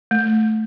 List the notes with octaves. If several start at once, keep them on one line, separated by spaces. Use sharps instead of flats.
A3